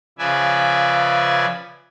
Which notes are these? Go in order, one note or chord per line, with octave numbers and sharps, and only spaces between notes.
C#3 F3 B4 D5 E5 G#5